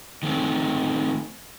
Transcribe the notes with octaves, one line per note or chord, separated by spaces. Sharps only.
D#3 A3 C4 C#4